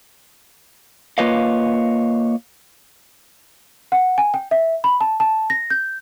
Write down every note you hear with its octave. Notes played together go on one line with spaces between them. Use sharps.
A#3 F4 B4 C#5 D#5 F5
F#5
G#5
G5
E5
B5
A5
A5
A#6
G6